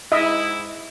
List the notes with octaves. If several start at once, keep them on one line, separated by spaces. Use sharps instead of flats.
G#2 E4 D#5 E5